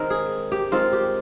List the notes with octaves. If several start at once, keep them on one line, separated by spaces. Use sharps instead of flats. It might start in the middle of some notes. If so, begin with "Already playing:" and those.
Already playing: D#3 G#3 C4 A#4
G#4
G4
D#3 G#3 C4 F4
G4